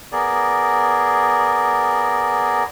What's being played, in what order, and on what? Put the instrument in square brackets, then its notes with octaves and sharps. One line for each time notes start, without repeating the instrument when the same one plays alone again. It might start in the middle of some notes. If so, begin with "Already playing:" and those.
[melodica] B3 G#4 A#4 D5